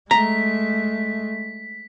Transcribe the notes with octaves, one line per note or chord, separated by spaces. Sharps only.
G#3 A3 A#5 B6